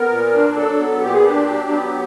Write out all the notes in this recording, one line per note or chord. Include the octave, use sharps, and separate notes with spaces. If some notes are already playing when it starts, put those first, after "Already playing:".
Already playing: B3 A#4
A#2
D4
F#3 A4
B3
A#2 G4
G#4
D4 G4
F#3
B3